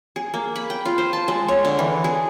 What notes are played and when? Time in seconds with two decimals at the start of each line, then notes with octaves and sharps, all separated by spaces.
0.16 G#4
0.34 A#3
0.56 B5
0.70 G5
0.85 F4
0.98 C5
1.13 A5
1.28 G#3
1.48 C#5
1.65 D3
1.79 E3
2.04 G#4